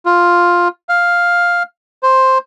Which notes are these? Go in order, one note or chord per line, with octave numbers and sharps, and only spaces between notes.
F4
F5
C5